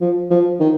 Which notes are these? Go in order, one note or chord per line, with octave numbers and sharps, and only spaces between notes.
F3
F3
D#3